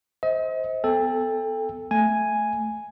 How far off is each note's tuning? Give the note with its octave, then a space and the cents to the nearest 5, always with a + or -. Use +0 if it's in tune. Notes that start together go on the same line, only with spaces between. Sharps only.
C5 +0 D#5 +40
B3 +30 A4 +0 G5 +30
A3 +0 G#5 +0